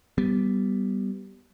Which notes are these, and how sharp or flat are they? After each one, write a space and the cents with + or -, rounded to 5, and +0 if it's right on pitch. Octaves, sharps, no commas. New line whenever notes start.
G3 -10 B3 +0